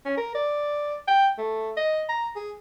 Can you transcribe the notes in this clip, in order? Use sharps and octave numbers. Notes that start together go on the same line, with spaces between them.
C#4
A#4
D5
G5
A3
D#5
A#5
G#4